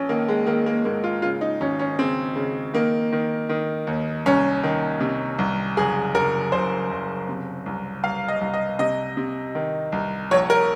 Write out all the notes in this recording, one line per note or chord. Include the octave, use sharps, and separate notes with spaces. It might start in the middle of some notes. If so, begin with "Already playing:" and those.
Already playing: A#1 C#4
D#3 A#3
G#3
D#3 A#3
A#3
G#2 A#3
F4
C#3 F4
D#4
G#1 C#4
C#4
C#3 C4
C#3
D#3 A#3
D#3
D#3
D#2
C2 C#4
D#3
C3
C2
F#1 G#4
F#1 A#4
F#1 C5
F#1
C3
C2
C2 F5
D#5
C2
D#5
C3 D#5
C3
D#3
C2
A#1 C#5
A#4